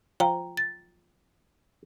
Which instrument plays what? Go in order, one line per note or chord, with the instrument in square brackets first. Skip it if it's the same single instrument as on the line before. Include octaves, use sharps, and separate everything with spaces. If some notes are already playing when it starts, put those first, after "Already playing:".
[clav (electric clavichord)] F3 [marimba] G5 A#5
[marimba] A6